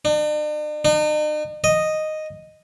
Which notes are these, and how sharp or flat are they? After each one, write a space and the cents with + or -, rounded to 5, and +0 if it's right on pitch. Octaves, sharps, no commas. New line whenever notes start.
D4 +45
D#4 -45
D#5 -5